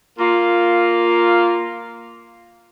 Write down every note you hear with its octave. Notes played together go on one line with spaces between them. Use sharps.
A#3 F4